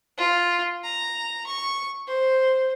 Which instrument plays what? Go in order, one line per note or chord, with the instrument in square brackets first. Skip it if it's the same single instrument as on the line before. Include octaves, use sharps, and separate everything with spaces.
[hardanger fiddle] F4
A#5
C#6
C5